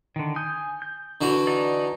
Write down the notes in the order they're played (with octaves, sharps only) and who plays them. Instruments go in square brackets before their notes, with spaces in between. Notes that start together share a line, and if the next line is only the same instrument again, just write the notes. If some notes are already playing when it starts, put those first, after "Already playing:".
[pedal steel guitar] D3 D#3
G#5 D#6 G6
G6
[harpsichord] D3 E3 F#4
[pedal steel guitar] D#4 D5